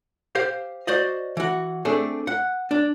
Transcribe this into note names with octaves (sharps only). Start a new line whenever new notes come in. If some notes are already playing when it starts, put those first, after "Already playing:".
G4 C5 F5
F#4 C5 D5 D#5
E3 F#4
A3 C4 D4 G#4 A4
F#5
D4